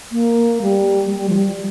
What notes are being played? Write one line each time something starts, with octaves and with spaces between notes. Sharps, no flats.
A#3
G3
G3
F3
G3